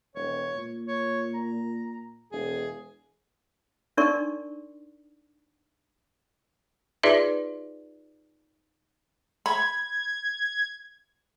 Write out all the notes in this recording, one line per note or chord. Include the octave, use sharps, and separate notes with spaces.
E1 C#5
A#2
C#5
A#5
E1 G#4
D4 D#4 A#4 D5 C6 C#6
D#4 F4 G#4 B4 D5 E5
B5 G#6